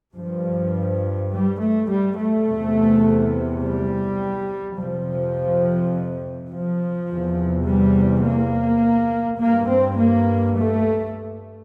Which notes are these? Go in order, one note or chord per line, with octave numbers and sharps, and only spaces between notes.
G2 F3
G3
A3
G3
A3
E2 C3
G3
F2 C3 F3
F3
E2 C3
G3
A#3
G2 A#3
C4
A#3
A3